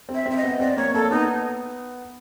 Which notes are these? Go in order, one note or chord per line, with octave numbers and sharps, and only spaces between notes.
C4
E5
C4 E5
D#5
B3
C4 D5
A#3 C#5
A#3 A4
B3 D#4